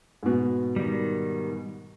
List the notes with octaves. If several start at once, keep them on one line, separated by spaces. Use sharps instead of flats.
G#2 B2
D#3 G3